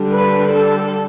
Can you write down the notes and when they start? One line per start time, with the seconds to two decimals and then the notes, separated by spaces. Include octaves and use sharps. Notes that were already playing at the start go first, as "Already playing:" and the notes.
Already playing: D3 G3 D4
0.12 B4
0.51 A4